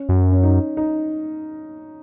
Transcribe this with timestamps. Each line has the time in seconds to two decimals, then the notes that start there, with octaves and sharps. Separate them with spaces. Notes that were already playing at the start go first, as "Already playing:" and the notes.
Already playing: C#4
0.09 F#2
0.32 C#4
0.43 D#4
0.77 D#4